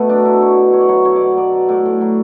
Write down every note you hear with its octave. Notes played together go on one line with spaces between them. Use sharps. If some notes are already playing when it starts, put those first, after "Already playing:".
Already playing: B2 A3 B3
F#3 D4
F#3 E4
B2 C#5
B2
F#3 C#5
D5
F#3 C#5
B2 C#5
D5
B2
F#3 D5
F#3
A2 D5
A2
F#3